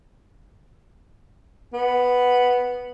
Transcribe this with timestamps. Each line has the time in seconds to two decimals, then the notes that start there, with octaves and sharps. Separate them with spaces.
1.73 B3